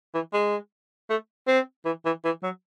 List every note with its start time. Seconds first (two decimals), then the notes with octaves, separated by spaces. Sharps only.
0.14 E3
0.33 G#3
1.10 A3
1.47 C4
1.85 E3
2.05 E3
2.25 E3
2.43 F#3